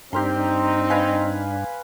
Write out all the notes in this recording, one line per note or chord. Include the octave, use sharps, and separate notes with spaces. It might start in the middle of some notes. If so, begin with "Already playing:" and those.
G2 C4 D4 D#4 G4 A#4 C6
B4 F5 G#5